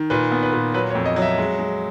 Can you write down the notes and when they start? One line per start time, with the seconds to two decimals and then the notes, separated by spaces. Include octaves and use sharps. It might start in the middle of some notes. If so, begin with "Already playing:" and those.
Already playing: D#3
0.10 A#2 B4
0.32 B3
0.43 B4
0.53 A#2
0.74 F#3 B4
0.90 C#5
0.95 F2
1.06 D#5
1.16 F#3
1.22 E5
1.38 G#3
1.59 G#3